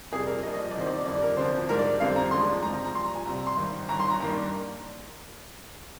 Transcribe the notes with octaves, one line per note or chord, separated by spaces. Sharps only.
F2 C3 G3 D4 G#4
A#4
G2 F3 A#3 D4 D#5
D#5
D#5
D5
C2 C3 D#3 C5
D5
F2 D3 G3 D4 D5
A#4
D2 D3 F3 C4 C5
G#2 G3 D4 A#4
D5
F2 D3 G3 C4 F5
A#5
D#2 D3 F3 G#3 D4 C6
G#1 G#2 F3 C4 A#5
A#5
A#5
A#1 A#2 G3 C6
A#5
G#5
C2 C3 G3 A#5
A#5
C6
G#1 G2 D#3
G1 G2 D#3 A#5
C6
A#5
G2 D#3 A#3 D4 A#5